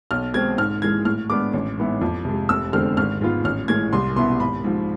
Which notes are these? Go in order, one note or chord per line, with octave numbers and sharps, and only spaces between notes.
B1 F6
B2 G#3 C4 G#6
G#2 F6
E3 G#3 G#6
A2 F6
G#3 B3 D4 D6
A1
G#2 E3 B3 E4
F2
C3 G#3
F1 E6
E2 D3 G#3 C4 F6
G#1 F6
G#2 G#3 B3 F4
A1 F6
A2 E3 G#3 G#6
C2 C6
B2 B3 E4 C6
G#1 B5
G#2 F3